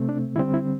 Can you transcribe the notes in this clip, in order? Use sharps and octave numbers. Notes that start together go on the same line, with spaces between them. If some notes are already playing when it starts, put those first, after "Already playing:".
Already playing: C3 A3 C4
D4
D3 G3 C4 E4
E4